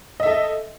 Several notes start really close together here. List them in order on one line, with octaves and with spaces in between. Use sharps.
D#5 E5 A4